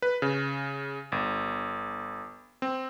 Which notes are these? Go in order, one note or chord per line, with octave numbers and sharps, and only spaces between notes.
B4
C#3
G1
C4